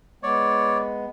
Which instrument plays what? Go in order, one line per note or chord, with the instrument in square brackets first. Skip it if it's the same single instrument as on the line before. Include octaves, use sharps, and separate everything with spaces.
[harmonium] G#3 B3 [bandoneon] C#5 D5